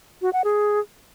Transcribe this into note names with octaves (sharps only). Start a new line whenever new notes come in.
F#4
F#5
G#4